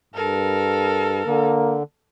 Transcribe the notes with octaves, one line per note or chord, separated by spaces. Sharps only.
G2 A4 A#4
D3 A#3